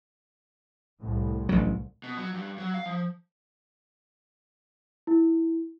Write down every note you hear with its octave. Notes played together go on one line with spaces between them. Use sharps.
C2 A2
A1 D2 F#3
B2
F#3
G2
F#3
F5
F3
E4